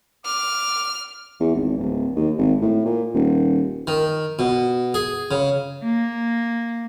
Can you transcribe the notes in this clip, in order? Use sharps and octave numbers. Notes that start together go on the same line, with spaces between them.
D6 F6
E2
G#1
D1
D#2
G#1
A2
A#2
D#1
D#3
B2
G#4
C#3
A#3